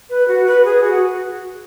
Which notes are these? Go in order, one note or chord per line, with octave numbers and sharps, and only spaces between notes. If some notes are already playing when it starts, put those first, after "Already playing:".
B4
F#4
B4
G#4
F#4